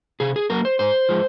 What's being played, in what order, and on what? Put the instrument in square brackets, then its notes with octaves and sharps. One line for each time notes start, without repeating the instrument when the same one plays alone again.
[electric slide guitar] C3 G#4
G#4
F#3 A#3 A#4
C5
G#2 C5
F3 G#3